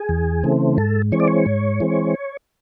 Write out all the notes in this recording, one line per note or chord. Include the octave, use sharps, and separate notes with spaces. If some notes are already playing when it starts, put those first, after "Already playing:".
Already playing: G#4
E2
C#3 E3 A3 C4
G#2 A4
E3 G#3 C4 C#5
D5
C#5
G#2
E3 G#3 C4